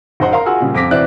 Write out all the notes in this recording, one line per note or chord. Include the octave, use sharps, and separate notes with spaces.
F#1 D#4 C5 F#5 C6
A#4 F5 A#5 C6
F4 F#4 G#4 F#5 G#5 E6
A#2 C#3 G3
F2 D6 A#6 B6
E1 E3 C4 D5 E5 F#6